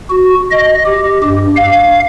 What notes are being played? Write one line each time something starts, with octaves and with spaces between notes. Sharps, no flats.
F#4
D#5
G4
G2
F5